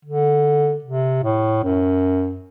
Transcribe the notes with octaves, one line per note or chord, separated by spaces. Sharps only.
D3
C3
A2
F#2